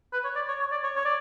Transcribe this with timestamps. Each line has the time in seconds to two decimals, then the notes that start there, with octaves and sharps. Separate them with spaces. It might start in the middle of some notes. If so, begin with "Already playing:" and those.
0.13 B4
0.24 C#5
0.36 D5
0.48 C#5
0.60 C#5
0.71 D5
0.83 C#5
0.96 C#5
1.05 D5